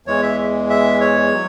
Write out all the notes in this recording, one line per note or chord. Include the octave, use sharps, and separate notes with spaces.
E2 E3 G#3 C#5
E5
E5
C#5
F#3